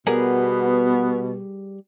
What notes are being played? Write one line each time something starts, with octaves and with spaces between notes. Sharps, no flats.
B2 G3 B3 G#4 A#4